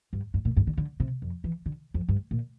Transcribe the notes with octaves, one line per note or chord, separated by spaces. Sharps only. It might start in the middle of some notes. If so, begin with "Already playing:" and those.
G2
G2
A#2
G2
D3
D3
C3
F2
E3
D3
F2
G2
A#2